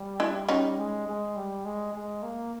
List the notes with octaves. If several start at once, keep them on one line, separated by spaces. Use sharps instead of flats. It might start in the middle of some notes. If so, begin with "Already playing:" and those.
Already playing: G3
D4 E4
C#4 D#4
G#3
G#3
G3
G#3
G#3
A#3